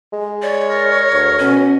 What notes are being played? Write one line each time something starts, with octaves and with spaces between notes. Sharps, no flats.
G#3
C#5 D5
A#4
D2
B2 C#4